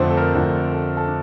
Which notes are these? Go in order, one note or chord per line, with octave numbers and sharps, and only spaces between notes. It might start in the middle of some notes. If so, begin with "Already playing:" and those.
Already playing: F2 D3 F3 A3 C4 D4 C5
A4
A#4
F2 D3 F3 A3 D4
A4
A4
D4